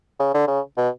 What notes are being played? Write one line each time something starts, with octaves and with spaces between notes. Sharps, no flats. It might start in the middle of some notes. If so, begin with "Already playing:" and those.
C#3
D3
C#3
B2